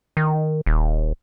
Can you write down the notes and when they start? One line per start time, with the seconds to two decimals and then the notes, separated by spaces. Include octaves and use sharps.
0.17 D#3
0.66 D#1